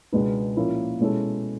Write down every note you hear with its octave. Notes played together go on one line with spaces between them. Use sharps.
C#2 B2 G#3 B3 D4
A#2 F3 A#3 C#4 E4
B2 G#3 C#4 E4 A4